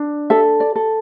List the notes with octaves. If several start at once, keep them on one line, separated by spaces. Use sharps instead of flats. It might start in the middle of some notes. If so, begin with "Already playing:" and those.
Already playing: D4
A4 E5
D5
A4